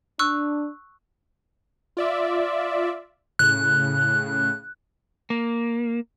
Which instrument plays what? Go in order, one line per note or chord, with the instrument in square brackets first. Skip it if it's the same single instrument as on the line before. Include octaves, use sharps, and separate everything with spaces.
[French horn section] D4 [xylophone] C#6 E6 F#6
[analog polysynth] F4 D5 E5
[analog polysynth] A2 C#3 [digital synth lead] F#6
[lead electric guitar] A#3